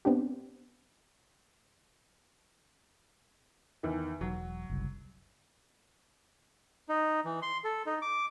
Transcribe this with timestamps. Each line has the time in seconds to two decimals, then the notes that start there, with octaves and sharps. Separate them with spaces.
0.05 B3 C4 D4 G4
3.83 E2 D#3
4.21 E1 F#3
4.70 F#1 C2
6.89 D#4
7.25 E3
7.42 C6
7.64 A4
7.86 D#4
8.02 D6